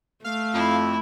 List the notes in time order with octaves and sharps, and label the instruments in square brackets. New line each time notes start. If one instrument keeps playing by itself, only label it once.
[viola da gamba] A3 [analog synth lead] F5
[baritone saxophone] F2 [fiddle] E4